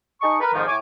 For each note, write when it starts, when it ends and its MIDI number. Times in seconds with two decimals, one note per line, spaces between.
0.21 0.38 63
0.21 0.38 68
0.21 0.38 75
0.21 0.38 81
0.21 0.38 85
0.41 0.51 70
0.41 0.51 71
0.54 0.63 41
0.54 0.63 44
0.54 0.63 51
0.54 0.63 53
0.68 0.76 45
0.68 0.76 73
0.68 0.76 80
0.68 0.76 86